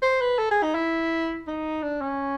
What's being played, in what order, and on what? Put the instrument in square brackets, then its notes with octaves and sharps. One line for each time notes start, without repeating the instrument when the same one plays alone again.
[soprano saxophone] C5
B4
A4
G#4
D#4
E4
D#4
D4
C#4